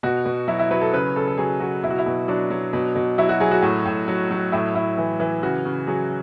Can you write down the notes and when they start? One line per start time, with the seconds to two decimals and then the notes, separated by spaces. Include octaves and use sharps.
0.03 B2 F#4
0.25 B2
0.48 F#3 E4
0.59 E4
0.70 F#3 B4
0.81 A4
0.93 C#3 B4
1.16 C#3 A4
1.28 A4
1.38 F#3 G#4
1.60 F#3 F#4
1.83 B2 E4
1.90 F#4
1.99 E4
2.06 B2
2.28 F#3 D4
2.50 F#3
2.73 B2
2.95 B2
3.18 F#3 E4
3.29 F#4
3.40 F#3 G#4
3.51 F#4
3.62 A2
3.85 A2
4.08 F#3
4.31 F#3
4.52 A2 E4
4.75 A2 E4
4.98 E3
5.20 E3
5.42 C#3 F#4
5.65 C#3
5.87 F#3 G#4